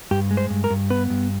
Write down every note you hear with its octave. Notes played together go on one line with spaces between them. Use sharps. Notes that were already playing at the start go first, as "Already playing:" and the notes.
G2 G4
G#3
C5
G2
A#4
G2
B3 B4
G2